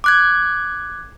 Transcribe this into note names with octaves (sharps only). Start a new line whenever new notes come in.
D6 F#6 G#6